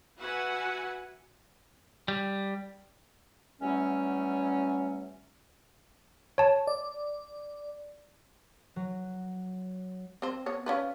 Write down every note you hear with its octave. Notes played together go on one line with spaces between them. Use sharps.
F#4 B4 E5 F#5 G#5
G3
E2 F#3 G3 A3 C#4
C#5 A5
D5
F#3
C4 C5
B3 C#5
C#4 F4 B4